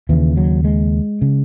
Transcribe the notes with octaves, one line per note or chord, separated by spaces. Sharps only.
D#2 C#3 E3
F#3
G#3
C#3